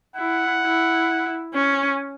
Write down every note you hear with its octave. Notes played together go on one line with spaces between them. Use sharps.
E4 F#5
E4
C#4